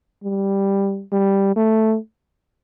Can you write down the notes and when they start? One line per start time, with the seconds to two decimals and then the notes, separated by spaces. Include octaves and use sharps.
0.24 G3
1.12 G3
1.56 A3